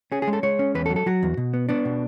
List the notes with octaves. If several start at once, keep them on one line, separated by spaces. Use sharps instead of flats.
C#4 G#4
G#4
G#3
A4
G#3 C#5
C#4
E2 B4
A4
F#3
A4
F#3 F#4
E2
B2
B3
B3 D4
B2